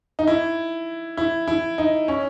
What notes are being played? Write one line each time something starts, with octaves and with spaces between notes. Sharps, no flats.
D#4
E4
E4
E4
D#4
C#4